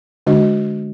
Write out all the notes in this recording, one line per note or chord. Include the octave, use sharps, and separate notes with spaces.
D3 G#3 D4 F#4 D#5